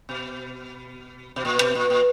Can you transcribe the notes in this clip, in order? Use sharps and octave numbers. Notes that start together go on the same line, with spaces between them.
B2
B2
A#2
B2
A#2
A#2